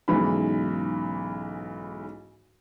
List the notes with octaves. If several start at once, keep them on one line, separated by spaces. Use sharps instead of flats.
B1 G#2 C#3 E3 B5